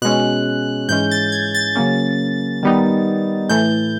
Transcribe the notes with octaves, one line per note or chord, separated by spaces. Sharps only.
B2 G#3 C#4 F#6
G#2 E3 G#3 C#4 G6
A6
G#6
A6
C#3 F#3 A#3 C#4
D#3 G3 B3 D#4
A2 E3 A3 G6